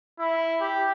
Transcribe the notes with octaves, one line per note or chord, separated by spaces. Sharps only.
E4
G4